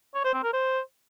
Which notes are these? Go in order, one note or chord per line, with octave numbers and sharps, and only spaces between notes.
C#5
C5
C4
A#4
C5